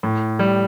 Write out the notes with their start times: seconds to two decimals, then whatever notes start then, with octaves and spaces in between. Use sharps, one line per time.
0.03 A2
0.39 G3